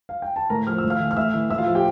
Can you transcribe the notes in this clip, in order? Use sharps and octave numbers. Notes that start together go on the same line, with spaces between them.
F5
G5
A5
A2 A#4 A#5
F3 F6
E6
A2
F5 F6
E3
F6
A2 E5 E6
E3
A2 E5 E6
F4 F5
F3
G4 G5